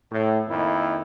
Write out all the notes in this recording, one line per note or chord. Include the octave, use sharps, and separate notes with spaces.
A2
F2 D#3 A#3 E4